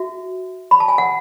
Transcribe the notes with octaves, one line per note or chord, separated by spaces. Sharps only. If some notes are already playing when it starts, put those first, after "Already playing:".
Already playing: F#4 E5
B5
A5
G#5
F#5